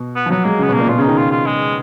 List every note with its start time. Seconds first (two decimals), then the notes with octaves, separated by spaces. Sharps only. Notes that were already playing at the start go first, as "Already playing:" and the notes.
Already playing: B2
0.16 B3
0.26 F3
0.30 F#3 B3
0.45 G#3 A#3
0.59 C#3 B3
0.69 B2 A#3
0.79 A#2
0.88 B2 F4
0.99 C#3 D#4
1.08 D#3
1.18 F4
1.31 F4
1.47 G#3